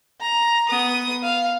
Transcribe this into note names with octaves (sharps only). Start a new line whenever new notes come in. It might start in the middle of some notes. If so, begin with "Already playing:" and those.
A#5
B3 D#6
F5